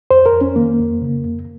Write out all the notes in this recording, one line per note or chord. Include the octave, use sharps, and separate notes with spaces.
F2 C5
A#4
F2
C#4
D#3 A#3
F2
C#3
F2